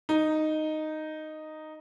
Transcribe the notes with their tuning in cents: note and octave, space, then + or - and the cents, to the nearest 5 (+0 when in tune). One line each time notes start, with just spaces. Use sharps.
D#4 -5